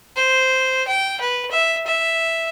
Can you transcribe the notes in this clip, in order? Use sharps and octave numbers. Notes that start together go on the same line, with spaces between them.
C5
G5
B4
E5
E5